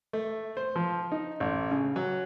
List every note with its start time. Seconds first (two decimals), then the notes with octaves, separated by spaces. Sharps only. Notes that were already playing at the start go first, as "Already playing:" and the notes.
0.13 A3
0.57 C5
0.76 F3
1.12 D#4
1.40 A1
1.71 C#3
1.96 F#3